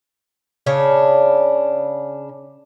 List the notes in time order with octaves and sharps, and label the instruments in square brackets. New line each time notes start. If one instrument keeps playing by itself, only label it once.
[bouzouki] C#3 D4 C#5